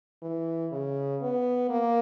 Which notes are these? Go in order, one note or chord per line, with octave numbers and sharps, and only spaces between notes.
E3
C#3
B3
A#3